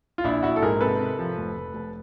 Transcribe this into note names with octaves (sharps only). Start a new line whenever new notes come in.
F4
A#1 D4 E4
A#1 E4 F#4
A4
G#2 G#4 A#4
C3 A4 B4
C3
F3
F1
F1
F1